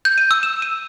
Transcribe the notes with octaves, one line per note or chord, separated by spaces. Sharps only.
G6
D#7
E6
E7
D#7